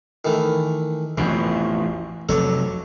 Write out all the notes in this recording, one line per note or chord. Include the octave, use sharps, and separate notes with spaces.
D#3 E3 A3
A1 F2 B2 E3
F1 F#3 A4 C#5 D5